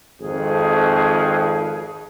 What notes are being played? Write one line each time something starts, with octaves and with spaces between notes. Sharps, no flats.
G#1 F2 G#4